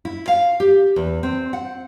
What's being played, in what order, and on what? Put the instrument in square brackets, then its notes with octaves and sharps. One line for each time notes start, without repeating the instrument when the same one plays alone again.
[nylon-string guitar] E4
F5
G4
E2
C4
F#5